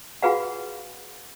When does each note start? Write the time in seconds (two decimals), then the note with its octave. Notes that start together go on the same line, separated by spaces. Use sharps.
0.22 F4 F#4 G#4 B4 F5 F#5